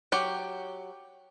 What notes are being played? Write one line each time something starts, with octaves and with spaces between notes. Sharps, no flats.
F#3 G4